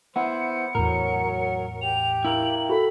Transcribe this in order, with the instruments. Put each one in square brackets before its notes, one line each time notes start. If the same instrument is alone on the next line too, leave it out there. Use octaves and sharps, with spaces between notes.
[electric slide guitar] B3 E4 [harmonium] C5 [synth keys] F#5 [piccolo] C#7
[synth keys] E2 A2 [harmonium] F#3 [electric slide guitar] A#4
[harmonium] G4 [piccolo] F7
[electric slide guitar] E4 A#4 F5 [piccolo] F#7
[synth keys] F#4 A4 [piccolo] B5